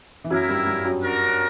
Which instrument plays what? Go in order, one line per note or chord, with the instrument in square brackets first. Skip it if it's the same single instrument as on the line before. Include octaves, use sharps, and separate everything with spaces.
[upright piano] E3
[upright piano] F#2 F#3 [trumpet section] A#3 E4 A#4 E5
[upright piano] G2 G3
G2 G3
F#2 F#3
[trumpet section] D4 F#4 A#4